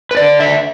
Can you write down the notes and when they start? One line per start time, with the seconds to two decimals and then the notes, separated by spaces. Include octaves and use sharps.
0.11 B4
0.17 D3 D5
0.40 E5